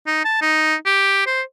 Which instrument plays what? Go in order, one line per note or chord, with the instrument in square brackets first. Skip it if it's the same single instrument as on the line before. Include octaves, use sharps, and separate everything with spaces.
[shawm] D#4
A5
D#4
G4
C5